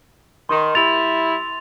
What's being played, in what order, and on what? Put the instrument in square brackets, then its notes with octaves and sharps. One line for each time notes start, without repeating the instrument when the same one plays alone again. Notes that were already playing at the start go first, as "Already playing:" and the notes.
[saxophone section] D#3 [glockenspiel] C6
[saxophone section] G3 E4 [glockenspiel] A6 F7